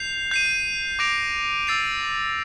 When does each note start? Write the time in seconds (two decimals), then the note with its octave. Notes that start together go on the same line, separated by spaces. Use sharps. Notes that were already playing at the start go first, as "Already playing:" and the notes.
Already playing: G6 C7 F7
0.31 G6 C7 D#7
0.99 D6 G6 A#6 D7 F7
1.67 E6 A6 C7 F7